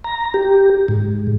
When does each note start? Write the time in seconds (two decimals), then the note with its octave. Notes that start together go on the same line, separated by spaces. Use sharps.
0.04 A#5
0.34 G4
0.88 G#2